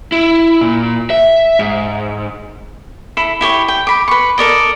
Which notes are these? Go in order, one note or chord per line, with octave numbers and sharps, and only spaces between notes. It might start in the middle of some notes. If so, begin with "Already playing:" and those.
E4
A#2
E5
G#2
E4 A4 B5
E4 G4 C#5
G5
B5 D6
B4 C#6
A4 A#4 D5 D#5